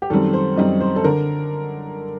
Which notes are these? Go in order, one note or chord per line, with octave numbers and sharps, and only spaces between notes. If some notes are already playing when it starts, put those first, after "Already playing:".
G4
F#2 D#3 G3 C4 A4
C5
F#2 D#3 G3 C4 D#5
C5
A4
D3 A#4